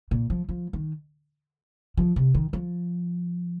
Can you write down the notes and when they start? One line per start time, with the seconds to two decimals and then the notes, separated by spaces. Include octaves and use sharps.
0.11 A#2
0.30 F3
0.49 F3
0.73 D#3
1.97 F3
2.16 C3
2.34 D#3
2.53 F3